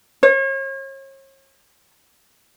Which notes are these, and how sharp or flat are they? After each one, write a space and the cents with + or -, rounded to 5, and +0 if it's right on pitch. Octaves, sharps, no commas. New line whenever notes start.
C#5 -40